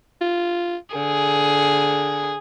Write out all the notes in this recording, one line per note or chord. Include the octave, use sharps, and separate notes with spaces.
F4
D3 G#4